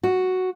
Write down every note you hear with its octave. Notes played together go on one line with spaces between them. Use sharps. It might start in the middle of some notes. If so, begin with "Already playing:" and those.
F#4